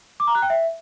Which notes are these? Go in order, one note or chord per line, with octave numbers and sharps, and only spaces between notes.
D6
A#5
F#6
G5
E5